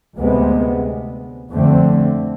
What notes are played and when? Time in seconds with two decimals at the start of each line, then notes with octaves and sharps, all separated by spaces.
0.16 D2 C3 G#3 B3
1.50 F2 D3 A3 C4